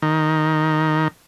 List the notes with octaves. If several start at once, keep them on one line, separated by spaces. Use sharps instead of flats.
D#3